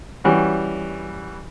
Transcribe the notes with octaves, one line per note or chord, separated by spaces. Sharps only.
E3 G3 C#4 F#4